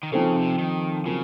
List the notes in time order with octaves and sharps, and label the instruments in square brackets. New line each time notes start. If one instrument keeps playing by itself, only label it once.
[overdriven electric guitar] D#3
[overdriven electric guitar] C#3 [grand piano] F3 C4 D#4 A4 C5
[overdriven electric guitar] C3
D#3
[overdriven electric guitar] C#3 [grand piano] F#3 C4 F4 A#4